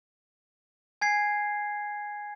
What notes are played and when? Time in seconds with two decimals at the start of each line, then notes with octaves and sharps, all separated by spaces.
1.01 G#5 G#6 C7